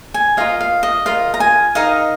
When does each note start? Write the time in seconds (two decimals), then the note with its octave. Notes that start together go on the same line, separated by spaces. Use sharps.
0.14 G#5
0.37 F4 A#4 D#5 F5
0.61 F5
0.83 D#5
1.06 F4 A#4 D#5 F5
1.34 A#5
1.40 G#5
1.75 D#4 A#4 D#5 F5